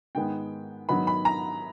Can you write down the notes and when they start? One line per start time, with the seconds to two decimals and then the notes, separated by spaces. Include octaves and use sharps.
0.15 G#2 D#3 G#3 B3 G5
0.89 G#2 D#3 F#3 B3 D#4 B5
1.07 B5
1.25 A#5